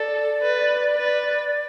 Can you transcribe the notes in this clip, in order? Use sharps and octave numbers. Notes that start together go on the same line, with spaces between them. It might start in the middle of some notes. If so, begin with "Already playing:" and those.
Already playing: A4 D5
B4
B4